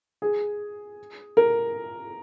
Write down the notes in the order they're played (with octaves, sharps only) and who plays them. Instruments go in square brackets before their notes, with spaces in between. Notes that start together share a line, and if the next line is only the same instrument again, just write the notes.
[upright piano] G#4
A#4